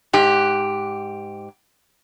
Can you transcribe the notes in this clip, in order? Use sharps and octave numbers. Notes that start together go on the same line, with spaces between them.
G#2 G4